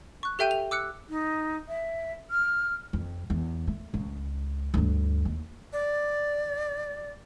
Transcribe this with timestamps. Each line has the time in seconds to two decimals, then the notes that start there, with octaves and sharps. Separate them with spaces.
0.23 C#6 F#6
0.39 G4 A4 E5 G5 G6 D#7
0.51 F7
0.71 D6 E6 F#6 C#7
1.09 D#4
1.68 E5
2.31 F6
2.93 F2
3.30 E2
3.67 A3
3.94 C#2
4.74 D2 G2
5.25 D#2
5.73 D5